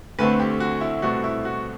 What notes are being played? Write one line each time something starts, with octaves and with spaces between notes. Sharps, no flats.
D2 D3 A3 C4 B4
G4
F#4
E4
C2 B2 A3 C4 F#4
E4
F#4